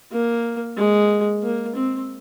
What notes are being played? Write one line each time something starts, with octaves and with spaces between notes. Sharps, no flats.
A#3
G#3
A#3
C4